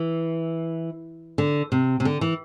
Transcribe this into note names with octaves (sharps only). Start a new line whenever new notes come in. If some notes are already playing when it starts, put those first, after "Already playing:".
Already playing: E3
D3
C3
C3
D3
E3